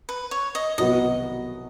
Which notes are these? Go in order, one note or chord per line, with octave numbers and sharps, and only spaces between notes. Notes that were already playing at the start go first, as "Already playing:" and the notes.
B4
C#5
D#5
C2 B2 F#3 B3 D#5